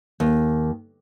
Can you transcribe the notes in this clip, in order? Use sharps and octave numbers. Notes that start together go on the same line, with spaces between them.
D#2